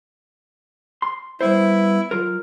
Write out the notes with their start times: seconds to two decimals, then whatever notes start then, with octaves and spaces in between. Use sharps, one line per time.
1.02 C6
1.41 G3 B3 E4 C5
2.11 F#3 F4 A#4